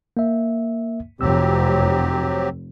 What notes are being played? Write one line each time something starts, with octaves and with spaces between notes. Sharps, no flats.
A#3 E5
F1 F#3 C4 G4 E6